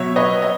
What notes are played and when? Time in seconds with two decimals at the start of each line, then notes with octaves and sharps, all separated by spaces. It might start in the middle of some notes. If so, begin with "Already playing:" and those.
Already playing: B2 F#3 C#5 E5
0.16 B4 D#5
0.42 D#5